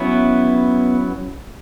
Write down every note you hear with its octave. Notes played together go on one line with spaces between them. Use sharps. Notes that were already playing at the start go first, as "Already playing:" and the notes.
Already playing: F#3 B3 C#4 E4 B4